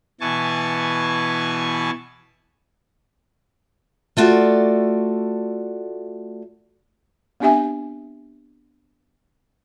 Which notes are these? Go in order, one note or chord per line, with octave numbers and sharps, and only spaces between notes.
B2 E3 G#5 A5 C#6
A3 F4 F#4 A4 D5
B3 C4 D4 G4 E5 G#5